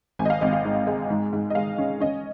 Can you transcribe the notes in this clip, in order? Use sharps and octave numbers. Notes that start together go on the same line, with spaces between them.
G#1 G#5
D#5
F5
G#1 D#5
F5
G#2
G#3
G#2
G#2
D#5
G#3 F5
C#4
C#4 D#5